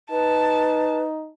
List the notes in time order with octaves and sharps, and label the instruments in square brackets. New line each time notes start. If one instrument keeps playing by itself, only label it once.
[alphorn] D#4 [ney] B4 [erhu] A5